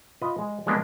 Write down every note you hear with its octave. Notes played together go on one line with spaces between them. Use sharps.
F4 B4 D#5
G#3
G3 G#3 A#3 B3 C#4 D4